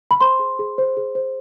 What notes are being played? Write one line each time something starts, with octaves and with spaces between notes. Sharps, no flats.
B5
C5 C6
G#4
G#4
C5
G#4
C5